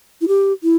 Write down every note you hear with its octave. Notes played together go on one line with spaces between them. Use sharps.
E4
G4
E4